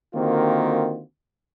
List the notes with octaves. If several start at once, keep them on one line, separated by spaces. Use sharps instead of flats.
D3 D#3 A#3 C4 F4 F#4